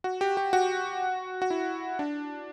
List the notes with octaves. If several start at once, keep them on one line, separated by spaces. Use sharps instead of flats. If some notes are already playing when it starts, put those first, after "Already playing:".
F#4
G4
G4
F#4
F#4
E4
D4